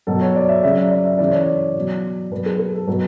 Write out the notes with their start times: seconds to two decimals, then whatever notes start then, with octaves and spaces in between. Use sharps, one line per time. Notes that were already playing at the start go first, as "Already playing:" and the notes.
0.07 B2 F#3 A4
0.21 C#5
0.36 D5
0.49 E5
0.63 C#3 F#3 E5
0.77 D5
0.91 D5
1.05 E5
1.18 C#3 E3 D5
1.31 C#5
1.43 D5
1.76 B2 F#3
2.31 B2 F#3 B4
2.46 G#4
2.59 G#4
2.74 A4
2.87 B2 F#3 B4